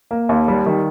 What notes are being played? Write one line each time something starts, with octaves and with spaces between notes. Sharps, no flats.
A#3
D#2
G3
D#3